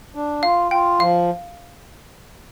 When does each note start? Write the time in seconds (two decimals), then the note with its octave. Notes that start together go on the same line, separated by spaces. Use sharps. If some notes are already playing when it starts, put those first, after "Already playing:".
0.15 D4
0.43 F4 F5
0.71 F4 G5
1.00 F3 F5